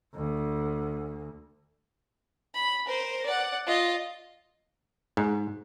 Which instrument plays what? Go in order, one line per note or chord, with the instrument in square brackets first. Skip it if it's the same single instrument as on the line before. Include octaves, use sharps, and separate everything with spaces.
[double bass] D2
[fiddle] B5
A#4 C5
D5 F#5
F4 D#5
[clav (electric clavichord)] G#2